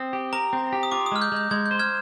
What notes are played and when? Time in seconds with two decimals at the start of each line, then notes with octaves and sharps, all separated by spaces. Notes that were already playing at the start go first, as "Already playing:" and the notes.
Already playing: C4 D#6
0.13 G4
0.33 A#4 A#5
0.53 C4
0.73 G4
0.83 D#6
0.91 F4 D6
1.06 D#6
1.12 G#3 F6
1.22 G6
1.32 G#3 G6
1.51 G#3 G#6
1.66 G6
1.71 C5
1.79 F6 G#6